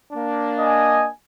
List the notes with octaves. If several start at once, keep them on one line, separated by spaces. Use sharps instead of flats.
A#3 D4
D#5 G#5